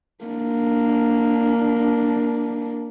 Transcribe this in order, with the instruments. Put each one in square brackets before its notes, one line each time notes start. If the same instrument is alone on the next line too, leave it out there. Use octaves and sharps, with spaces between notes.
[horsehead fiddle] A#3 D4